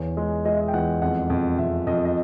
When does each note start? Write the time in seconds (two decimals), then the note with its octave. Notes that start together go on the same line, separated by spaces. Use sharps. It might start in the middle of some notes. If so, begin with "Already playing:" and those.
Already playing: E2 C#5
0.17 G#3
0.45 G#3 D#5
0.53 E5
0.60 D#5
0.68 G5
0.74 E2 F#5
1.02 F2 F#5
1.30 F2
1.59 F2 E5
1.87 F2 D#5
2.05 D#5